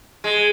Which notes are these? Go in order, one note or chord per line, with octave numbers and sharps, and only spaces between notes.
G#3